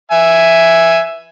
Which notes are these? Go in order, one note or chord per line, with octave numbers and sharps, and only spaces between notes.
E5 G#5